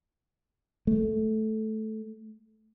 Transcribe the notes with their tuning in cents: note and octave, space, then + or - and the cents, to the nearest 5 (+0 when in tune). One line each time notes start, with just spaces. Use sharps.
A3 -10